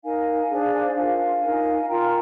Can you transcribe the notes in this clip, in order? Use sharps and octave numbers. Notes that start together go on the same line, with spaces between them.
D#4 A#4 F5 G#5
D4 G#4 C5
D4 F4 A#4 F5 G#5
D#4 A#4
F4 A#4 G5 A#5